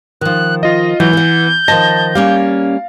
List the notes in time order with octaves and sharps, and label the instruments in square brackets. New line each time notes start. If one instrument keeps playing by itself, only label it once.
[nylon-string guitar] D#3 F3 [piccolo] F#6
[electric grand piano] F4 D#5 [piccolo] A#6
[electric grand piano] E3 [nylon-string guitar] F#3 [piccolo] G6
[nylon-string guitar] B3 F#5
[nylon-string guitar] D#3 F3 D#5 [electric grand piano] A5 A6 A#6
[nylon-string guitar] G3 A#3 C#4 [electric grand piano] F5